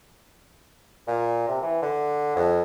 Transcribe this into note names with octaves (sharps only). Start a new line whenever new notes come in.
A#2
C3
E3
D3
F2